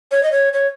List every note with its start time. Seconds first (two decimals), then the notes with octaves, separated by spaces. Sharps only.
0.11 C#5
0.23 D#5
0.32 C#5
0.53 C#5